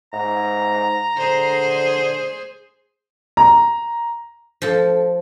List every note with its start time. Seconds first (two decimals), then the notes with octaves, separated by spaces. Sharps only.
0.13 G#2 A#5
1.17 D3 G#4 C5
3.37 A#5
4.62 F3 A4